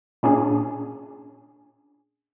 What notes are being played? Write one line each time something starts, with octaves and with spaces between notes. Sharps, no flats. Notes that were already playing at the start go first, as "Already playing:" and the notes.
A#2 C#4 D4 G#4